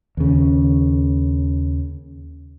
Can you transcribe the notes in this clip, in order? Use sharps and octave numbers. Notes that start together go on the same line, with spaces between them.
D#2 C#3